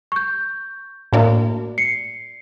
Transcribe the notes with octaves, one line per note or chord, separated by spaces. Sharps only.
C#6 G6
A2 A#3 D4 F#4 D5
C7 C#7